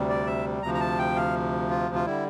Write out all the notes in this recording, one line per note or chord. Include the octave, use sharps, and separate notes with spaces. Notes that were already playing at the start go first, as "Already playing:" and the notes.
Already playing: D2 C3 G3
D5
E5
D2 C3 F3 A#5
A#5
A5
G5
F5
F4
F4
D3 G3 E4